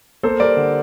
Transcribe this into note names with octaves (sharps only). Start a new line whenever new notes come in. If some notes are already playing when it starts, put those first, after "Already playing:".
A#3 A4 C5
G3 A#4 D5
D3